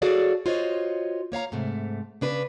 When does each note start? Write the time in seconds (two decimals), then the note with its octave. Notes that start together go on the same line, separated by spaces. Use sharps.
0.02 F#4 G#4 A4 C#5 D5 F5
0.46 F4 F#4 C5 C#5 D#5
1.32 A#3 C#5 F5 A#5
1.52 G#2 C3 A3
2.21 C#3 D4 B4